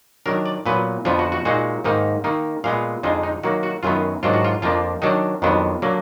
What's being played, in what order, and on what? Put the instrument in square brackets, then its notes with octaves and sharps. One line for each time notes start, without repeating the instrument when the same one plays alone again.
[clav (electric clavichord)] D#3 F#3 D4 A#4
D5
A#2 F#3 B3 B4
F2 D3 F3 B3 F4
F#4
F#4
A#2 G#3 D#4 F#4
G#2 D#3 A#3 D#4
D#3 A#3 D#4
A#2 G#3 B3 F5
F2 D3 G#3 D#4 F4
D#4
D#3 F#3 A#3 F#4
F#4
F#2 D#3 F#3 B3 F4
G#2 D#3 F#3 D4 F4
F#4
F4
F2 F3 A#3 D4 F4
D#3 F#3 D4 D#4
F2 D#3 F#3 B3 D4
D3 F#3 A#3